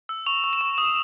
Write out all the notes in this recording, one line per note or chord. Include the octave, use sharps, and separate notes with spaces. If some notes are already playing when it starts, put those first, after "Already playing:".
E6
C#6 F7
C#6
E7
C#6
D#6